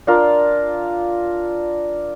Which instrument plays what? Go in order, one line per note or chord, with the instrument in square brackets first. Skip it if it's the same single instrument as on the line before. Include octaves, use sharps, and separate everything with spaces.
[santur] D4 F4 A#4